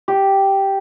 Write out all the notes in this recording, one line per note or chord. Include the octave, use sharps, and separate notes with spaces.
G4